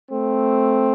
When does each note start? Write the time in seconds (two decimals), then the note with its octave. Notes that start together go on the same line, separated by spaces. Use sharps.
0.11 A3 C4